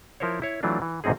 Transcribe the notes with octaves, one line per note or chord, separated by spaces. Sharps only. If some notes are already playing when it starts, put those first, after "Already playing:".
F3 E4 A#4 C5 C#5
E4 C#5
E3 F#3 A3 D4 F4
E3
A1 G#2 C3 C4 D#4 G#4